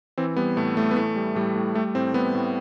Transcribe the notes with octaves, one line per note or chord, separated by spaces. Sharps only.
E3 C4
G3 B3
A2 A3
A2 A3
B3
E3 A3
G3
A2 G3
A2
G3 A3
A2 C4
G3 B3
A2